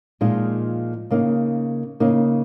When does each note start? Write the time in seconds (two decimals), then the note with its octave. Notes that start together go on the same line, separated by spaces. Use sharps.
0.21 A#2 F3 G#3 D#4 G#4
1.11 C#3 A#3 D#4
2.00 C#3 A#3 D#4